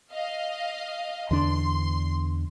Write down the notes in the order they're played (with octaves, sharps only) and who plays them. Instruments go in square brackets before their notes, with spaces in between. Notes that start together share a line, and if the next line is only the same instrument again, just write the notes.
[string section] D#5 F5
[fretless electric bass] E2 D3 D4 [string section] C6